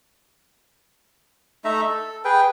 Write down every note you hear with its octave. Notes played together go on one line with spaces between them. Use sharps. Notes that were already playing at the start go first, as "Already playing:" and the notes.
A3 D#4 E5 A#5
A4
G#4 B4 G5